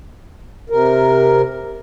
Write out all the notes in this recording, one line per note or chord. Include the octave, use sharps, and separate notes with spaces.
C3 A#4